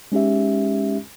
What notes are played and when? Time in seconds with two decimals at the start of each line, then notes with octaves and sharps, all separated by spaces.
0.12 G#3 C#4 D#4 G4 E5